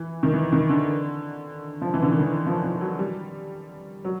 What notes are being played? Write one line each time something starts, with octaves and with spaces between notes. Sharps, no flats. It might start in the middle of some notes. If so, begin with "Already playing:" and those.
Already playing: E3
D#3
E3
D#3
D3
F3
E3
D3
D#3
E3
F3
F3
F#3
G3
F#3